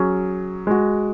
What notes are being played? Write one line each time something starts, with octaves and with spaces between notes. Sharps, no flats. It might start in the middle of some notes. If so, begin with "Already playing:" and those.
Already playing: F#3 C#4 G#4
G#3 F#4